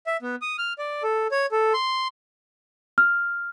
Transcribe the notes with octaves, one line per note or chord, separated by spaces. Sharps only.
E5
B3
D#6
F6
D5
A4
C#5
A4
C6
F6